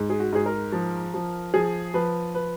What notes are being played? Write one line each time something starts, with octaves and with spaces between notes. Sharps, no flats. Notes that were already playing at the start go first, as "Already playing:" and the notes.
Already playing: G#2
G#4
F#4
G#2 G#4
A#4
F3
F3
F3 G#4
F3 B4
B4